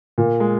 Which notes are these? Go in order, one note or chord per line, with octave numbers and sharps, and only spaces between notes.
A#2
G#3